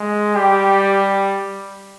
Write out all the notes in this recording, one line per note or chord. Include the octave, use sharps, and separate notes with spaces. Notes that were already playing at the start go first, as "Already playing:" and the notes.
Already playing: G#3
G3 G4